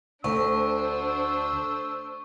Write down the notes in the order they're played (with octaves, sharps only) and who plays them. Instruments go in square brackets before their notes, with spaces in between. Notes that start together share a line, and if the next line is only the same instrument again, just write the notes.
[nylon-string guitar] D2 [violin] D4 C5 [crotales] C#6 [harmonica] E6